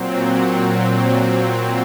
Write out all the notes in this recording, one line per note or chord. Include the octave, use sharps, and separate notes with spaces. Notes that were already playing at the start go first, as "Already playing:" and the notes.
Already playing: A#2 F#3 C4
F#5